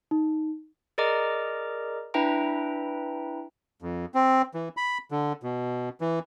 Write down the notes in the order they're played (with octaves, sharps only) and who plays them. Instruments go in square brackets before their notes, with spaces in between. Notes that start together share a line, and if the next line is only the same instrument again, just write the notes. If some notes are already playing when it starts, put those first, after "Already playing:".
[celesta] D#4
[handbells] G#4 A#4 D5 D#5 A#5 D6
D4 E4 B4 E5 G5 A#5
[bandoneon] F2
C4
E3
B5
D3
B2
E3